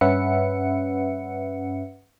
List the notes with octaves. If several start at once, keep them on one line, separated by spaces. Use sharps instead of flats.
G2 C#4 B4 E5 F#5 C#7